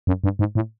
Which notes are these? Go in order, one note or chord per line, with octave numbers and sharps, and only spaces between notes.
F#2
G2
G#2
A2